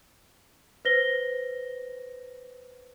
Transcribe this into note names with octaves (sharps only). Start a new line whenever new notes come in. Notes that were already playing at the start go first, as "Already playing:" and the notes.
B4 C5 A#6 G7